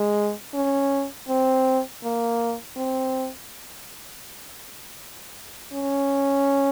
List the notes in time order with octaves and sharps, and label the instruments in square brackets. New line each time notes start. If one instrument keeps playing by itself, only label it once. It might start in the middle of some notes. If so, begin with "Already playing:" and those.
Already playing: [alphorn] G#3
C#4
C4
A#3
C4
C#4